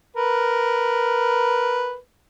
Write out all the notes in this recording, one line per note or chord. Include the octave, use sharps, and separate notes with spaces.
A#4 B4